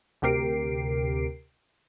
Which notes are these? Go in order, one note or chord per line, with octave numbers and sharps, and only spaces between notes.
D2 C3 G4 A#4 C7 D7